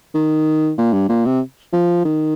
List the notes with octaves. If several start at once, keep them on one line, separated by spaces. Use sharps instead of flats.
D#3
A#2
G2
A#2
C3
F3
D#3